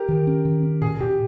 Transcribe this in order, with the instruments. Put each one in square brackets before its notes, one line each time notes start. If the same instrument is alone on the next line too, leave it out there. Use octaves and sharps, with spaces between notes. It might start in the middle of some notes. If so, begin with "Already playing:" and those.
Already playing: [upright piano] G4 A#4
[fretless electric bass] D#3
C#4
D#3
C#4
[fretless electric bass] A#2 [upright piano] G#4
[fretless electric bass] A#2 [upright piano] G4